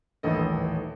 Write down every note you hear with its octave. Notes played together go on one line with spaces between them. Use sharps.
D#1 A1 D#3 E3 A4 D#5